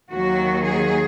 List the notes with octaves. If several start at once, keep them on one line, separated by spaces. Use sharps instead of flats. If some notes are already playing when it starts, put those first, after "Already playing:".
D#2 D#3 F#3 F#4
G#4